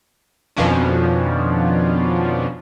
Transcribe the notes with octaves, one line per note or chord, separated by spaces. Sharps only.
F2 B2 D#3 F3 C#4 D4